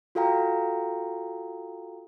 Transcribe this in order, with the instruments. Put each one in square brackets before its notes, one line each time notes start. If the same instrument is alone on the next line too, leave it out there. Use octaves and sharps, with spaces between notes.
[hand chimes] F4 F#4 A4 F5 G5 A#5